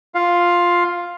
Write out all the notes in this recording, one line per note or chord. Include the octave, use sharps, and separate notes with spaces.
F4 F5